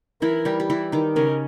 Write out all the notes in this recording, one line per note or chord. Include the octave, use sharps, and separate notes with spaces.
E3 E4 A#4
G3 G4
G4
E3 E4
D#3 D#4
C#3 C#4 A#4